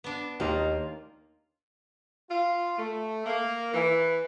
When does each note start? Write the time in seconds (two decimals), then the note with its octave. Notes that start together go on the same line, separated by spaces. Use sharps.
0.04 B3 D4
0.40 D#2 A#3 F4 G4 D#5
2.29 F4
2.77 A3
3.25 A#3
3.74 E3